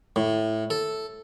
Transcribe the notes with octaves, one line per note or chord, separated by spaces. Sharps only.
A2
A4